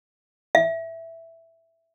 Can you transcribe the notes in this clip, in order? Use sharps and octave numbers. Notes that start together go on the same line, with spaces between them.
E5